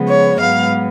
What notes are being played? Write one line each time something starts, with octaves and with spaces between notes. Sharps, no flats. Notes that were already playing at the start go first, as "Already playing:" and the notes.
Already playing: C#3 F3 G#3 B3
C#5
G#2 F#3 B3 F5